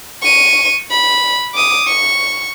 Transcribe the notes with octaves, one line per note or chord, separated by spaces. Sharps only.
C#6 D#7
B5
D6 D#6
C#6